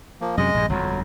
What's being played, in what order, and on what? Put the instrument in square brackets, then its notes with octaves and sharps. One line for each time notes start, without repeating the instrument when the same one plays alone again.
[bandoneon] F3 A#3
[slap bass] F#2 C3 F#3 [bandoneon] G#3 D#5
[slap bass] A#1 G2
[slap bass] G1 F2 [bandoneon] F#3